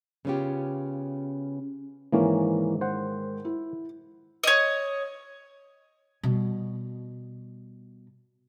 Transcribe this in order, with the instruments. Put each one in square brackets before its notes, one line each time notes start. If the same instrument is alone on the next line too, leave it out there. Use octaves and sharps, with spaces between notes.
[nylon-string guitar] C#3 B3 C#4 F4 G4
[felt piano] G#2 D#3 [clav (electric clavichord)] E3 A#3 C#4
[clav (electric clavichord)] C5 F#5
[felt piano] E4
[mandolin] C#5 D#5
[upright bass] B2 G3